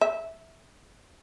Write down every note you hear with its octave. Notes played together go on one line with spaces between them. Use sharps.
E5